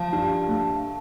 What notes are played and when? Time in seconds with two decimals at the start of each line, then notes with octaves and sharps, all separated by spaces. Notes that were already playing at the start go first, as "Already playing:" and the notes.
Already playing: F3 F5 A5
0.12 G2
0.47 A3